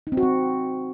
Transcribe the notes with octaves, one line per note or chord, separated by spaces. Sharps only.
D#4
C4
F#4
C4